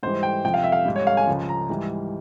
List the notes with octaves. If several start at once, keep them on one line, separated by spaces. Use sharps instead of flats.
G#2 E3 G3 C5
G5
F2 C3 F3 G5
F5
E5
F5
G#2 G3
C#5
F5
G#5
C#2 C#3 F3
A#5
G#2 E3 G3